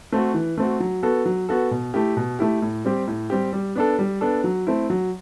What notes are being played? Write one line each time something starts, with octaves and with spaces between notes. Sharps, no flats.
A3 C4 F#4
E3
A3 C4 F#4
F#3
B3 F#4 A4
F#3
B3 F#4 A4
B2
A3 E4 G4
B2
A3 E4 G4
A2
G3 C4 G4
A2
G3 C4 G4
G3
B3 D4 A4
G3
B3 D4 A4
F#3
A3 C4 E4
F#3